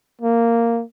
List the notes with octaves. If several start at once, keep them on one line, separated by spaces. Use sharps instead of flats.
A#3